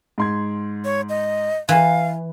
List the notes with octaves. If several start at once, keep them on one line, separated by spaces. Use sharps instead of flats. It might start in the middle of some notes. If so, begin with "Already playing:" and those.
G#2 C6 G#6
C#5
D#5
E3 F5